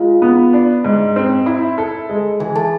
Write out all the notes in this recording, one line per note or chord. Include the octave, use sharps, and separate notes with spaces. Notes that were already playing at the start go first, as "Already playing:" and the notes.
Already playing: G#3 F4 F5
B3
D4
G#2
C4
E4
A4
G#3
E3 G#4 G#5
A4 A5